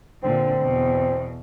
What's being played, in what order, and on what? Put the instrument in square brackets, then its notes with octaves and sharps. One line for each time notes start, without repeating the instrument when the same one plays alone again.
[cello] A#2 D3 [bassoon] C4
[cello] E2 B2